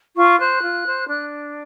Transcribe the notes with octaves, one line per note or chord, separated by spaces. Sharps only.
F4 C#6
C5 F#6
F4
C5
D4 F#6